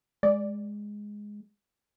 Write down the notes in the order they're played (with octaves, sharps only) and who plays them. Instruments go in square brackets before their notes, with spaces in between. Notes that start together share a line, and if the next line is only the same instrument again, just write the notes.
[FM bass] G#3 [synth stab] D5